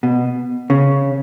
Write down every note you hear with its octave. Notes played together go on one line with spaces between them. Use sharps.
B2
C#3